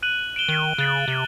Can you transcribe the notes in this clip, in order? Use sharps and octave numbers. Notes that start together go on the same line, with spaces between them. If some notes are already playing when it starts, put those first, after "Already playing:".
F#6 D#7 F#7
D7 E7 G7
D#3
C#3 F#6 A6 F#7
C3